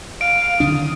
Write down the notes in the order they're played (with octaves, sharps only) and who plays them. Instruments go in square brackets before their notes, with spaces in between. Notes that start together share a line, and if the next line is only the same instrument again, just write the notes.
[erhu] F5 [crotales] D7
[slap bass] D3 D#3 D4 [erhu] D#6